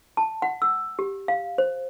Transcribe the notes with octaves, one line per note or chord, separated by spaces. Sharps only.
A5
F#5
E6
G4
F5
C5